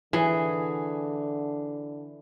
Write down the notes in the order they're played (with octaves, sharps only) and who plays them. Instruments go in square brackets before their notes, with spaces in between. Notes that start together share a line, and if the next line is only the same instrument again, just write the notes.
[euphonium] D3 [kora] E3 G#4